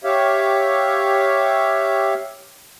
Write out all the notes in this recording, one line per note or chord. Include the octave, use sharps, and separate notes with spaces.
G4 C#5 E5 F5